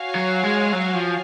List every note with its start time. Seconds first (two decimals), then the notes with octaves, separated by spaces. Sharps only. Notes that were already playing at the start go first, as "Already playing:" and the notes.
Already playing: F#4 C#5 F5 G#5
0.15 F#3
0.44 G#3
0.72 F#3
0.94 F3